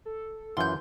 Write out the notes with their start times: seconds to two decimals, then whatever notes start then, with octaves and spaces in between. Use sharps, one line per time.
0.05 A4
0.57 F#2 E3 F4 F#5 C6 G6